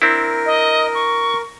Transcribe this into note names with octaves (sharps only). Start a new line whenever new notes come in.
C4 D4 E4 A#4
D#5
C#6